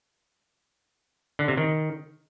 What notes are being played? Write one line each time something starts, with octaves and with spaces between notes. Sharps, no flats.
D3
C3
D#3